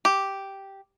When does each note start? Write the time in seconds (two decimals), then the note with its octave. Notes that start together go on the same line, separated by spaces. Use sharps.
0.05 G4